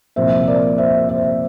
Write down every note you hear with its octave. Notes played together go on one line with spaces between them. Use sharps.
C2 A#2 F3 C5 E5
A#4 D5
C5 E5
C5 E5